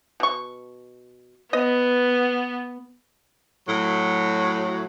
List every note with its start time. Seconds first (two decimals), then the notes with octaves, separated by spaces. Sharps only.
0.20 B2 C#6
1.53 B3 B4 D#5
3.68 A2 F#3